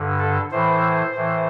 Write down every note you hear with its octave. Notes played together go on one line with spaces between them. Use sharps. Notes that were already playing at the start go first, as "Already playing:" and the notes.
Already playing: G2 D3
A4
A2 E3 C5
A2 E3